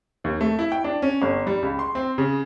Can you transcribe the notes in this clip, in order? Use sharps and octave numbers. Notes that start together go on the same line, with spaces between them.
D#2
A3
E4
G5
D4
C#4
G1
G3
C#2
C6
C4
C#3